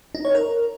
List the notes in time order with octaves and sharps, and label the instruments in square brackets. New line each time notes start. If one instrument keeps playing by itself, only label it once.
[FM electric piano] D#4
C#5
A#4